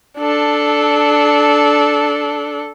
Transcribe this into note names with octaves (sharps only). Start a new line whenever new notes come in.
D4 A4